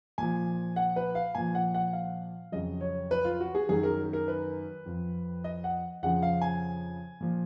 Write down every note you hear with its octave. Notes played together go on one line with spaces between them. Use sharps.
A#2 F3 G#5
F#5
B4
F5
A#2 F3 G#5
F#5
F#5
F5
F2 C#3 F#3 D#5
C#5
B4
F4
F#4
G#4
F#2 D#3 F#3 G#4
A#4
A#4
B4
F2 F3
D#5
F#5
F2 C#3 F3 F#5
F5
G#5
A#2 F3